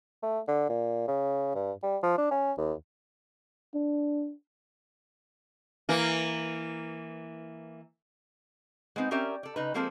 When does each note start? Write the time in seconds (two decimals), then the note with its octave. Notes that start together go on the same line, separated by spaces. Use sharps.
0.23 A3
0.48 D3
0.69 A#2
1.08 C#3
1.55 G2
1.83 G3
2.03 F3
2.18 D4
2.31 C#4
2.58 D#2
3.75 D4
5.89 E3 A#3
8.96 G#3 B3 C4 D#4
9.11 C4 C#4 G4 A#4 D5 E5
9.43 A4 D5
9.56 C#3 D#4 B4
9.74 F3 G#3 A#3 C4 A4 C5